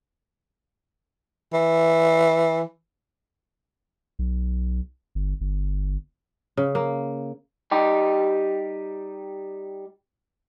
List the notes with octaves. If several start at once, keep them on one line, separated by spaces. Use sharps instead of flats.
E3
B1
G1
G1
C#3
A#3
G3 D#4 G4